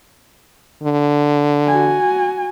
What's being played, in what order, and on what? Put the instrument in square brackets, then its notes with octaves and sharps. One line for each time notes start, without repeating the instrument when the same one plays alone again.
[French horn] D3
[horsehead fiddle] F#4 G#5